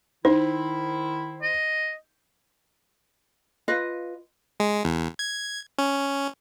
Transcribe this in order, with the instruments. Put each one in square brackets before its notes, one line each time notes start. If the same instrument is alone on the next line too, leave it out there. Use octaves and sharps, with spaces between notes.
[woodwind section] D#3 E4 [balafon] D#4 [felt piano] C5
[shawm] D#5
[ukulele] F4 B4 D#5
[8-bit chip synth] G#3
E2
G#6
C#4